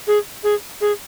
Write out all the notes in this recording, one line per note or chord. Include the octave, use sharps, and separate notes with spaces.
G#4
G#4
G#4